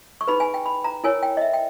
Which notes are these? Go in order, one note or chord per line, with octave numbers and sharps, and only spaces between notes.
C#6
D#4 G#4 B4 B5
G#5
G5
B5
A#5
E4 A#4 C#5 G#5
G5
D#5
E5
G5